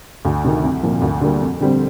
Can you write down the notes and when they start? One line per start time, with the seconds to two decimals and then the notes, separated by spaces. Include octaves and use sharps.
0.25 D2
0.44 C3 D#3
0.64 C2
0.83 A#2 F3
1.02 D2
1.21 D3 G3 A#3
1.41 F2
1.60 D3 G3 C4